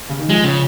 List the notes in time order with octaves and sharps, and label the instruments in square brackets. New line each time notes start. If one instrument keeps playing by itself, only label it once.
[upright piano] C#3
D#3
[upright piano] F3 [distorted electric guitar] G#3
[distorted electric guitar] C#3